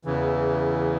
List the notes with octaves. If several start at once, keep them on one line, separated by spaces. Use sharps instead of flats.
E2 C#3 E3